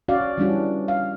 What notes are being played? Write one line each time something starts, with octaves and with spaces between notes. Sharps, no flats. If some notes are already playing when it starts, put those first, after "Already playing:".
C#4 F#4 D5 F5
E3 G3 C#4 D4 F#4
F5